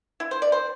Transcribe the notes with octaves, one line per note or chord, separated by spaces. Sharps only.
E4
C5
D5
C5